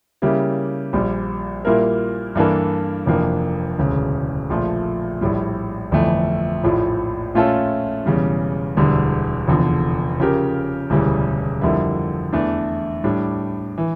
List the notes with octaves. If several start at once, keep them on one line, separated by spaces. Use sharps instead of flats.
C#3 G3 A#3 E4 G4
A#1 A#2 G3
A#2 G3 A#3 E4 A#4
G2 E3 A#3 D4 A4
F1 F2 E3 A#3 D4
E1 D2 C#3
A#1 A#2 F3 A3
A#1 A2 G3
G1 F2 E3 A3
A#1 A2 F3
A#2 A3 C#4 F4 A4
E1 E2 C#3 G3
E1 D2 D3 G3
F1 E2 D3 F3
C#3 F3 C#4 G4 A#4
E1 D2 C#3 E3 G3
F2 D3 G3 A#3 E4
E2 E3 A3 D4
A2 G3 D4
E3